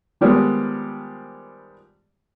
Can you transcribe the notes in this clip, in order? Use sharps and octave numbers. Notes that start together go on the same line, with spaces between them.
D#3 F3 G3 G#3 B3